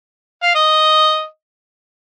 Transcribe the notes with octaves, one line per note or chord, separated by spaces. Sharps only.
F5
D#5